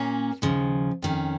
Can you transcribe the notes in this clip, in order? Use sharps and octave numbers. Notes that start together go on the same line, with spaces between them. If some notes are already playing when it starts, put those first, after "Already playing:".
Already playing: A#2 A#3 C#4
D#2 C#3 F3
F2 D#3 C#4